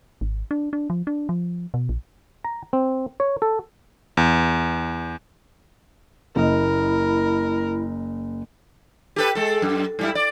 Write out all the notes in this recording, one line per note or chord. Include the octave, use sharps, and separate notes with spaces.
G#1
D4
D4
F3
D4
F3
B2
A#1
A#5
C4
C#5
A4
E2
F#1 E4 A#4 D#5
G4 A4 B4
G#3 A4
F#2
G#2 G3 E4
D5